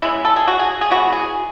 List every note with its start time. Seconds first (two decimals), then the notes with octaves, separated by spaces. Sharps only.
0.02 C#3 G#3 B3 E4
0.25 A4
0.36 G#4
0.47 F#4
0.59 G#4
0.81 G#4
0.90 E3 G#3 B3 F#4
1.12 G#4